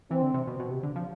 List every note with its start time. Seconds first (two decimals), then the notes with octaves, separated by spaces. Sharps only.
0.10 E3 C4
0.22 D3
0.34 C3
0.47 B2
0.60 B2
0.71 C3
0.83 D3
0.96 F3